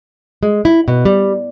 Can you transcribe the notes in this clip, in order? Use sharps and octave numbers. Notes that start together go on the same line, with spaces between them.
G#3
E4
B2
G3